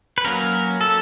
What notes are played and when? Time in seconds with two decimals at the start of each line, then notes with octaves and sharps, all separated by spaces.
0.18 B4
0.25 F#3 A#3 C#4 A#4
0.81 A4